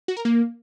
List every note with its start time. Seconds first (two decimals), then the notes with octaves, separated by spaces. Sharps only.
0.08 F#4
0.17 A#4
0.25 A#3